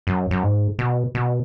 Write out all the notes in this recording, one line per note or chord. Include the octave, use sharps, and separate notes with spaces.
F#2
F#2
G#2
B2
B2